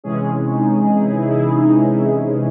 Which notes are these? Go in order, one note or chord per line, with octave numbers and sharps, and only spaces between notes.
C3 E3 G#3 C#4 G#4
D#4
D#4
E4
E4
D#4
E4